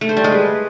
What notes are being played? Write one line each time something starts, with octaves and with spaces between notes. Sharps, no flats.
A3
C5
G3
G#3
B4